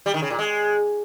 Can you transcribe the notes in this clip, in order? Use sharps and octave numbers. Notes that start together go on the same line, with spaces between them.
G3
D#3
C#3
A#2
G#3